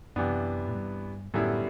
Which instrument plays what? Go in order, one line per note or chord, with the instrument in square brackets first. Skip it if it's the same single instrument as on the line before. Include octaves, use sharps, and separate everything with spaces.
[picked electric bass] F#2 [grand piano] C3 E3 B3 D4
[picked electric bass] A2
G2
[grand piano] F#2 D3 G3 B3 E4 [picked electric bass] A2